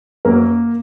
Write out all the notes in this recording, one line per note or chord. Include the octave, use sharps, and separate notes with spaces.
F#2 A#3 A#4